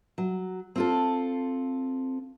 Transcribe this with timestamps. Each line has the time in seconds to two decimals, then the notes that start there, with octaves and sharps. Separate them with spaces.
0.18 F#3
0.76 C4 F4 A4